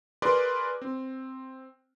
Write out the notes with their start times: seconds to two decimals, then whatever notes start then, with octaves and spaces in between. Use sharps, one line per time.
0.22 G#4 A#4 B4 D5 C6 D6
0.82 C4